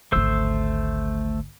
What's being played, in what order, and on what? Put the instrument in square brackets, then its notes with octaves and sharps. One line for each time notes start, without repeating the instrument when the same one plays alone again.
[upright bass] G#1 D2 [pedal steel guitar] A3 C5 E6